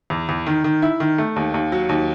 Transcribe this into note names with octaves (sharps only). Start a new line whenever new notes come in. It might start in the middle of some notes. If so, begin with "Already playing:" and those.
E2
E2
D#3
D#3
E4
D#3
A3
D#2
D#2
F#3
D#2